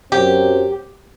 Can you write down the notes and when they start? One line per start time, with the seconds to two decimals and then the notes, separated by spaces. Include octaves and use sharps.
0.11 F#2 F#3 C4 G4